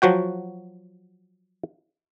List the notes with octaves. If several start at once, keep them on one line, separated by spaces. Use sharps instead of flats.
F3 F#3 F#4 G5